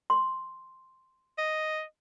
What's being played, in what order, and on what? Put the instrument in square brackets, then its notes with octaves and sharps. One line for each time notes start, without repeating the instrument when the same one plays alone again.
[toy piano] C6
[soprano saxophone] D#5